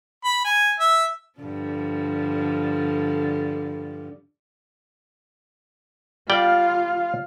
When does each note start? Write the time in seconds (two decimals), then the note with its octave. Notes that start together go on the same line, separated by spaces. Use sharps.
0.25 B5
0.45 G#5
0.80 E5
1.39 G2 D3 F3
6.30 G3 F4 D5 F5 G5